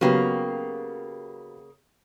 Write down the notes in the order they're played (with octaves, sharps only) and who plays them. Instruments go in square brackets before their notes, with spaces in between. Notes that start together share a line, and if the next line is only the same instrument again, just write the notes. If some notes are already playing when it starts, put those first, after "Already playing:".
[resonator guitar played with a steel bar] C#3 A#3 [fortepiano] F#3 B3 G4